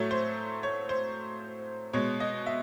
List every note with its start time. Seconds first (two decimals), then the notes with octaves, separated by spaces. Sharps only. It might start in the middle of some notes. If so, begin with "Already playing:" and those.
Already playing: A2 F#3 A3 C#5
0.11 C5
0.63 C#5
0.89 C5
1.93 B2 G#3 C#5
2.20 D#5
2.46 E5